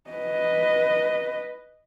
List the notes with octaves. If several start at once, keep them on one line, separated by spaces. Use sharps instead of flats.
B4 D#5